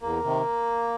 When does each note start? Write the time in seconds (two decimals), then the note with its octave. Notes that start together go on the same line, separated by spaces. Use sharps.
0.01 E2 A#3
0.24 C3 D#3